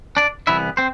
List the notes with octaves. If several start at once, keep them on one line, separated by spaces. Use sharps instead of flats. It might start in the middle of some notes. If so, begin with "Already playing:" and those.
D4 D5
C2 C3 E3 B3 E4 E5
C4 C5